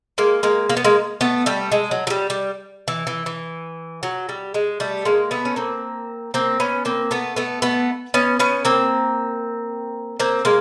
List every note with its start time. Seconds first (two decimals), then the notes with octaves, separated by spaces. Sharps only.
0.18 G#3 A#3
0.43 G#3 A#3
0.70 A#3
0.77 B3
0.84 G#3 A#3
1.21 A3 B3
1.46 G3 A3
1.72 G#3
1.91 F#3
2.07 F#3
2.10 G3
2.30 G3
2.88 E3
3.07 E3
3.26 E3
4.03 F#3
4.29 G3
4.54 G#3
4.80 G3 A3
5.05 G#3 A#3
5.31 A3 B3
5.45 C#4
5.56 A#3 C4
6.34 A#3 C4
6.60 B3 C#4
6.85 A#3 C4
7.11 A3 B3
7.36 A3 B3
7.62 A3 B3
8.14 B3 C#4
8.39 B3 C#4
8.65 A#3 C4
10.20 A#3 C4
10.45 G#3 A#3